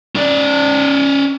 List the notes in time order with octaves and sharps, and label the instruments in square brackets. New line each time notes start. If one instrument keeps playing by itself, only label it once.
[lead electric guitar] C#4 D5